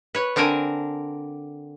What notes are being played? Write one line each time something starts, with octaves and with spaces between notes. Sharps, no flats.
B4 C#5
D3 C4 D4 A#4 G#5